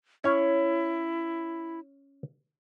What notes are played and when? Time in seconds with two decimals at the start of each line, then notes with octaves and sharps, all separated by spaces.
0.24 C#4 E4 C#5